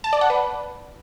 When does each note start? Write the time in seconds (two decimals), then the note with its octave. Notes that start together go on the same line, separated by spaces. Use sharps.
0.04 A5
0.13 D5
0.21 F#5
0.30 B4